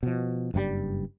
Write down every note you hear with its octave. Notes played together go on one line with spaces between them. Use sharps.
B2 F3
F#1 G2 A#2 G3